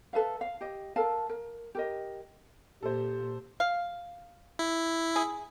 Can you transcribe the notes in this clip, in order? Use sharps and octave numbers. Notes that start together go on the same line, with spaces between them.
A4 B4 E5 F5
F5
G4 D#5
A4 A#4 F5 A5
A#4
G4 A#4 D#5
A#2 G4 A4 C5
F5
E4
G#4